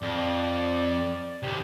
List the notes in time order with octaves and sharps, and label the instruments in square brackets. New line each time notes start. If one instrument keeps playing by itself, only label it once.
[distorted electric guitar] F2 [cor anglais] D5
[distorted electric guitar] D#2 C3 [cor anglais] G4